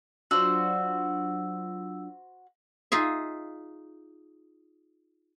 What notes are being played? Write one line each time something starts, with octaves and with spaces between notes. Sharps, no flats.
F#3 D4 F4 F#4 C5 E6
D#4 F4 G#4 E5